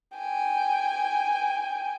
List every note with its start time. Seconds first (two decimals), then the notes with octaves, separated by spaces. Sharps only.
0.17 G5 G#5